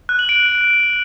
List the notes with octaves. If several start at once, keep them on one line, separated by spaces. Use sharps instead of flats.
F#6
F#7
D7